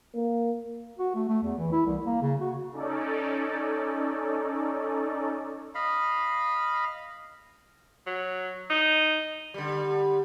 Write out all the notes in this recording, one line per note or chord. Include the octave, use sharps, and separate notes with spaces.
A#3
F#4
A3
A3
E2
E3
E4
C2
A#3
C#3
F#4
C#4 D#4 A4 D5
D#5 F5 B5
F#3
D#4
D3 G3